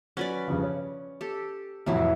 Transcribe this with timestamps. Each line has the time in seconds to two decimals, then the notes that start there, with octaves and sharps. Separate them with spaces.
0.17 F#3 C#4 F#4 B4 D5
0.48 G2 C#3 F3
0.63 C#5
1.21 G4 A4
1.86 C2 F2 A2 E3 F#3 E4